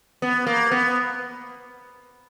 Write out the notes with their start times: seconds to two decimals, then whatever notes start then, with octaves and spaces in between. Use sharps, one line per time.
0.22 B3
0.47 A#3
0.71 B3